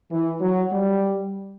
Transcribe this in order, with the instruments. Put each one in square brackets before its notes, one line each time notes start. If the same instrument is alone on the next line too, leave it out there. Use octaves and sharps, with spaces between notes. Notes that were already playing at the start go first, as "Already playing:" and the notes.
[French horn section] E3
F#3
G3